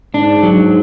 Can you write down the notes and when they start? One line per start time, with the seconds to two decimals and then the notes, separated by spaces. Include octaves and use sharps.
0.14 G#2 D4
0.43 F#3